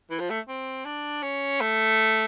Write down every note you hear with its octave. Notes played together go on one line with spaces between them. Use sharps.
E3
F3
A3
C4
D4
C#4
A3